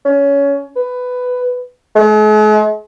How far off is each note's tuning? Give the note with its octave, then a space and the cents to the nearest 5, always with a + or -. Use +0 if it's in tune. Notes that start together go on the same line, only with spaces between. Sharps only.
C#4 +20
B4 +10
G#3 +45